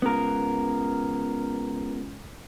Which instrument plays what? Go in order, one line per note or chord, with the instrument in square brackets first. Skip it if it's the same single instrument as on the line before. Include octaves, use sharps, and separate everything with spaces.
[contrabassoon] C#2 [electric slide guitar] B3 A#4